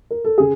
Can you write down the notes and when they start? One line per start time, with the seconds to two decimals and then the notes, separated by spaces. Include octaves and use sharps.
0.11 A#4
0.25 A4
0.38 C#3 G#4